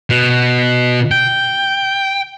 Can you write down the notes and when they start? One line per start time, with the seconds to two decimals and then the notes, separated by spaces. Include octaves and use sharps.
0.10 B2
1.11 G5